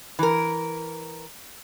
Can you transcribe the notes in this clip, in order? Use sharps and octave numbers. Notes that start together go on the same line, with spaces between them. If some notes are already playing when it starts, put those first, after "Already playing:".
E3 A#4